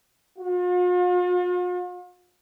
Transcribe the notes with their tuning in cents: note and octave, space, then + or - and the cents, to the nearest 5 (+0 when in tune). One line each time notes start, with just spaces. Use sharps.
F4 +45